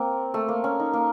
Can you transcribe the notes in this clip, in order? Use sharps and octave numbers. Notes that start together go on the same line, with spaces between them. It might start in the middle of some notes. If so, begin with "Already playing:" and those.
Already playing: A#3 C4
A3
A#3
C#4
D#4
A#3